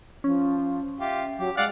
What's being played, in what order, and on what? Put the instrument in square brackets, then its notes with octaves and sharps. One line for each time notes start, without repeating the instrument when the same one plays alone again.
[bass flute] F3 [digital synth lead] C#4
[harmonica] F4 G4 [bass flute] E5
[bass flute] F#3 [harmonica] G4
[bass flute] G#3 [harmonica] D5 F5 F#5